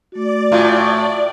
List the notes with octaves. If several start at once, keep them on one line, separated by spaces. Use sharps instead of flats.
A3 F#4 D5
A2 F4 G#5